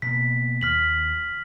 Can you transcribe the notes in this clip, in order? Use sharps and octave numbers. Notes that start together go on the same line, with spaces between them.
B2 A#3 B6
D#2 F6 B6 F#7